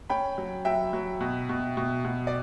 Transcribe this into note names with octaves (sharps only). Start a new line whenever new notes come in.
C#4 G5 B5
F#3
F#3 E5 G5
F#3
B2
B2
B2
B2
D5